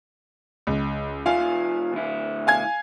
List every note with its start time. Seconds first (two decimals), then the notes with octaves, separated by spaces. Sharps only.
0.67 C#2
1.26 G3 F4 E5 F5 G#5
1.93 D2 E4
2.47 F5 G#5 G#6